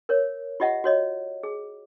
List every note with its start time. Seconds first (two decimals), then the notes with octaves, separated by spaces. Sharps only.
0.09 A#4 C#5
0.60 F4 G4 D#5 E5 F#5
0.84 F#4 C#5 D#5
1.43 G#4